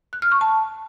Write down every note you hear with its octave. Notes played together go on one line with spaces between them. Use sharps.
F#6
F6
C#6
A5